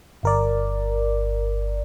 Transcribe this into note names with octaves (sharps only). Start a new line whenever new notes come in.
G1 A#4 D5